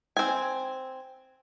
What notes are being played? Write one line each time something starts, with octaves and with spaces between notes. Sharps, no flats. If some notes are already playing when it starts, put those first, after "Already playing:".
C4 G#5